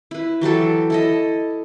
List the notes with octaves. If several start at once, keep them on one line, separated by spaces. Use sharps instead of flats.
E4 B4
E3 F#3 G4 A4
E4 A4 D#5